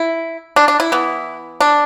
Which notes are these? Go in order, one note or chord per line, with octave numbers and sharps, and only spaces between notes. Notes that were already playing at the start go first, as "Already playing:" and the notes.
Already playing: E4
D4
D4
E4
E3 B3
D4